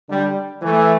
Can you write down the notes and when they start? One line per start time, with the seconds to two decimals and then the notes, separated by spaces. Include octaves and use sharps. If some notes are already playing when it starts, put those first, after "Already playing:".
0.09 D3 G3
0.62 E3 A3